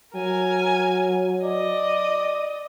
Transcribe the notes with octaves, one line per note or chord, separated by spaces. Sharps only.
F#3 A#4 G#5
D5 D#5